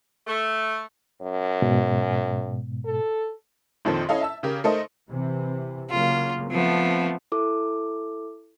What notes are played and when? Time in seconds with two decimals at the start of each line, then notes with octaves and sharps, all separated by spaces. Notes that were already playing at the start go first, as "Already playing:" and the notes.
0.26 A3
1.21 F#2
1.62 G#2 B2
2.85 A4
3.85 A#1 F2 D#3 F3 A4 C5
4.09 C#4 E4 A4 D#5 F5
4.21 E5 A5 E6
4.43 C#3 G4 A#4
4.64 A3 D#4 A4 A#4 C5 D#5
5.10 C3 E3
5.90 C#3 F#3 A#3 F4
6.51 F3 A3 B3 C4
7.32 E4 A4 D6